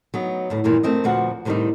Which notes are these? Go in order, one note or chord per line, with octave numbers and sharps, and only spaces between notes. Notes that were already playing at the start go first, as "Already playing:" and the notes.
F#3 B3 D#4
D2 A2
E2 G2 A#2 D#3 E3
A3 C4 A#4 D#5
D2 A#2 F3 F#4 B4 F#5
A2 C3 D#3 G3 D4 D#4